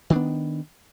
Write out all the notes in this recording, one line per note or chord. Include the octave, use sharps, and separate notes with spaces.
D#3 B3 D4